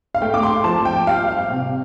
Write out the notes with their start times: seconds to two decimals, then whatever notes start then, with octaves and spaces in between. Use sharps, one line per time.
0.15 F5
0.22 A3 G5
0.34 D6
0.43 C6
0.64 F3 A5
0.85 G5
1.07 G3 F5
1.28 F5
1.50 C3